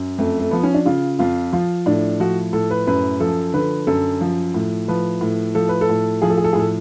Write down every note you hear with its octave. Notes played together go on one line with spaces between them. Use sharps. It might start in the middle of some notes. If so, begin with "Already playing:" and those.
Already playing: F#2
F2 A3
A3
F3 B3
C#4
D4
C#3 F4
F2 F4
F3 F4
A2 D4
F3 F#4
A2 A4
B4
F#2 B4
F3 A4
D3 B4
F#2 A4
F3
A2
F3 B4
A2
F3 A4
B4
A4
A2
F3 G#4
A4
G#4
A4
G#4
A2 A4